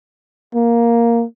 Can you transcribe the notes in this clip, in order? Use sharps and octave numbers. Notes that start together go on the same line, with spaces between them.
A#3